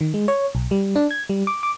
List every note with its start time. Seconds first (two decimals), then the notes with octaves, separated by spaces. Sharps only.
0.01 D#3
0.14 G#3
0.28 C#5
0.55 B1
0.71 G3
0.96 D4
1.11 G#6
1.29 G3
1.47 D6
1.63 D6